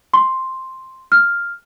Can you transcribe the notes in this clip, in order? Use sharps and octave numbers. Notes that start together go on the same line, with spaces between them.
C6
F6